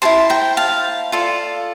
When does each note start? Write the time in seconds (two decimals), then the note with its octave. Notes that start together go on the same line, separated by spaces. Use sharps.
0.02 E4 A4 C5 A5 C6
0.30 G5 A#5
0.57 F5 A5
1.12 F4 A4 D5